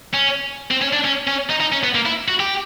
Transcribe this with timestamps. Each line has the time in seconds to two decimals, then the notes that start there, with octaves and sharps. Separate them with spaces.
0.14 C#4
0.71 C4
0.82 C#4
0.93 D4
1.04 C#4
1.27 C#4
1.50 D#4
1.60 D#4
1.72 C#4
1.83 B3
1.95 A#3
2.06 E4
2.28 F#4
2.40 G4